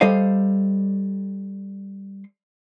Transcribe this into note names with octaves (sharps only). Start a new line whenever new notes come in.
G3 A4 C5 D#5 F5